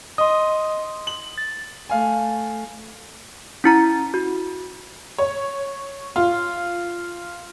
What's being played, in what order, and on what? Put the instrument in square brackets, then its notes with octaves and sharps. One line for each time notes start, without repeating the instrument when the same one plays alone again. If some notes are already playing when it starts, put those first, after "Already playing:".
[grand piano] D#5 [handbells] C6 D#6
[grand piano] F#7
[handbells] A6
[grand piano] A3 F5 G#5
[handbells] C#4 E4 A#5
F#4
[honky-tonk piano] C#5
F4